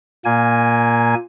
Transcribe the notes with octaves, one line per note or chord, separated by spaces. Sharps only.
A#2 A#3 G#5